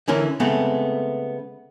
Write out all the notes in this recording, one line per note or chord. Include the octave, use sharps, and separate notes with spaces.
D3 E3 C#4 A#4
C#3 G#3 A3 B3 C4